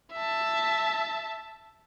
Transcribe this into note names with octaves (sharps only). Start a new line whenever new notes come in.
E5 A5